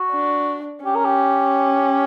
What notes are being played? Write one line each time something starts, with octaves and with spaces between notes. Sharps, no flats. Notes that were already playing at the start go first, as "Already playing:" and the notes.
Already playing: F#4
D4
C#4 G4
A#4
G4